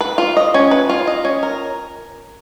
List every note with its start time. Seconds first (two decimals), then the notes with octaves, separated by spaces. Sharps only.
0.01 B4
0.18 F4
0.37 D#5
0.54 C#4
0.71 B4
0.89 F4
1.07 D#5
1.25 C#4
1.43 A#4